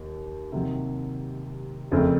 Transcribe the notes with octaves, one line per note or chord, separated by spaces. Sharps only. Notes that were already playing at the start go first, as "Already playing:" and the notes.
Already playing: D#2
C3 D#3 F#3 A#3
F#1 F2 C#3 A3 C4